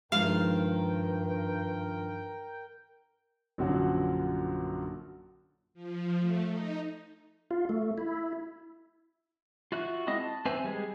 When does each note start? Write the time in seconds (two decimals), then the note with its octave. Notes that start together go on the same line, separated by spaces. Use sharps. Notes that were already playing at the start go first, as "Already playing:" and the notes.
0.12 G2 D#3 F3 G#3 A#4 F5 G5
3.58 A#1 F#2 D3 F3 F#3 F#4
5.74 F3
6.19 A3
6.49 D#4
7.51 F4
7.69 A3
7.98 E4
9.72 F4 F#4 E5 F#6
10.07 G#3 C4 E4 D#5 D#6
10.20 A5
10.45 C4 B4 C5 E5 G#5
10.64 G3 G#3 G#4